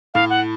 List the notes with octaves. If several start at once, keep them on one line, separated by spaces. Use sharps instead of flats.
A2 F5
F#5